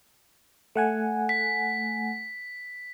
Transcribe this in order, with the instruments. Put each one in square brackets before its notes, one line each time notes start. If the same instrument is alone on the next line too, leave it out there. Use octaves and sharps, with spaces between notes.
[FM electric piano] A3 F#5 G#5
[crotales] B6